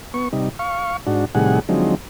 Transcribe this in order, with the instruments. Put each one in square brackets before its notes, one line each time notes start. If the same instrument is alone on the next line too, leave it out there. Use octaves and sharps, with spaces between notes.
[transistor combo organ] B3 C#6
C3 G3 D#4
F5 C#6
G#2 D4 F#4
A2 C3 D#3 G3 G#4 F#5
D3 F3 F#3 G#3 C4 D#4